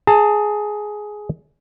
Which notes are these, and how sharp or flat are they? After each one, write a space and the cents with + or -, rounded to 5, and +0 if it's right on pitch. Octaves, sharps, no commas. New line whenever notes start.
G#4 +10 A5 +30